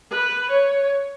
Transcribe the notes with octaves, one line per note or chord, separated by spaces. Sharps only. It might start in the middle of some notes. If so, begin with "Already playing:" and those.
B4
C#5